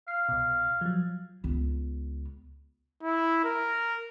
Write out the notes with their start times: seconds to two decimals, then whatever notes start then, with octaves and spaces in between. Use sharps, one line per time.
0.08 F5 F6 C7
0.29 C2 B2
0.81 F3 F#3
1.44 C#2 B3
3.03 E4
3.44 A#4